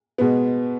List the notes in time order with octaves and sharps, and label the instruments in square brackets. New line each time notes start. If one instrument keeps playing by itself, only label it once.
[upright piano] B2 G#3 B3